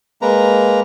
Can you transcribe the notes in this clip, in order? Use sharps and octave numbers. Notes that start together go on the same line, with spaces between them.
G#3 A#3 B4 A#5